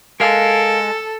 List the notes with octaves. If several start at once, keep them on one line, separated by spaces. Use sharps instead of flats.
G#3 A4 A#4 F5